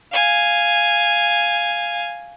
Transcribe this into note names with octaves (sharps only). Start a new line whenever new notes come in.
F5 G#5